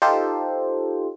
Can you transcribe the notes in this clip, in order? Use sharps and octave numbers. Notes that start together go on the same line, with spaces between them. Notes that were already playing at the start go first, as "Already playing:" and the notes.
D#4 F4 G4 A4 C5